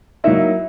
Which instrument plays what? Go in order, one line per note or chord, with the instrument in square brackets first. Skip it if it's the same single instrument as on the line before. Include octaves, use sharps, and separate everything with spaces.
[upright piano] F#3 A#3 D#4 A#4 [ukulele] E4 E5